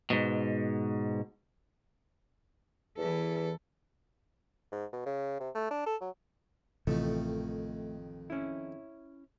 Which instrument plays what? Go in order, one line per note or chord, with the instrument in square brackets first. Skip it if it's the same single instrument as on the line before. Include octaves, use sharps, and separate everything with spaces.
[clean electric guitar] G#2 B2
[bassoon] E2 [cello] E3 A4
[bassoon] G#2
B2
C#3
C3
A3
D4
A4
F#3
[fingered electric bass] A1 C3 E3 [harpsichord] F2 D#3 [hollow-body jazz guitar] A3
[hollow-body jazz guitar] C#4 E4